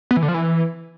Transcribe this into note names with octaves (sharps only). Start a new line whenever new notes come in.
B3
E3
D3
F3
E3